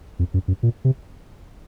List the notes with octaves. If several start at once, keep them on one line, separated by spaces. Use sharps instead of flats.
F2
F#2
F#2
A#2
C3